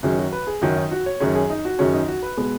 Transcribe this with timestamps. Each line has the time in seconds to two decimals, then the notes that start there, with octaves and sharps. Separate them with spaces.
0.03 F#2 D#3 F#3 C#4 G#4
0.18 F#4
0.32 B4
0.47 G#4
0.61 F#2 D#3 F#3 C#4 F#4
0.77 D#4
0.91 F#4
1.06 C#5
1.20 F#2 D#3 F#3 C#4 G#4
1.35 G#4
1.50 D#4
1.65 F#4
1.79 F#2 D#3 F#3 C#4 G#4
1.93 D#4
2.08 F#4
2.23 B4
2.37 B2 G#3 B3